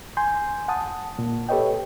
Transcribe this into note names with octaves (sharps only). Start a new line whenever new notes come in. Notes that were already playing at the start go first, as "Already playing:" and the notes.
G#5 C6 G6
F#5 A5 D#6
A#2
G4 A4 B4 C#5 D#5 G5